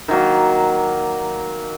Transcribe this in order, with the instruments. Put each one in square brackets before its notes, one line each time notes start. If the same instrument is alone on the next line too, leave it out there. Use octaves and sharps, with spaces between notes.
[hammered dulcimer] D#3 F#3 A#3